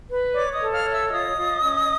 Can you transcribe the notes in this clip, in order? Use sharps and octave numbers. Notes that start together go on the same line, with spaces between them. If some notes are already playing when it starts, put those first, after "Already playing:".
B4
C#5 D5 D6
D#5 D#6
A4
F5 F6
C#5
E5 E6
F4 D#5 D#6
F4
C#4